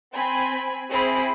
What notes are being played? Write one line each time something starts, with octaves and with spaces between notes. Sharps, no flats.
C4 G#5 B5
C4 E4 G#4 B5